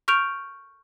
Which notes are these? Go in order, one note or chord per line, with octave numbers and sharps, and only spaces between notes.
C#6 F6 G6 D7 F7